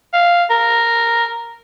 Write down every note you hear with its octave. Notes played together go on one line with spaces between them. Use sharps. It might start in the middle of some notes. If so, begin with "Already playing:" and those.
F5
A#4